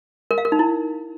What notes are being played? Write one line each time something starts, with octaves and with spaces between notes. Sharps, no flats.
A#4
F5
A#4
D#4
E4